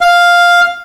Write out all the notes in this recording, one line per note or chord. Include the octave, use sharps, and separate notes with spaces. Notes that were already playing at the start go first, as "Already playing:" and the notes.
F5